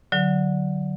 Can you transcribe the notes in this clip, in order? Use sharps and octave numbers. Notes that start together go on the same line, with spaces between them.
D3 F#3